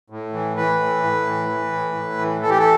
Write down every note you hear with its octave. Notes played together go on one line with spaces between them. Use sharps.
A2
E3
E3 B4
A2
A2
E3
E3
A2
A2
E3
E3 A4
G4
A4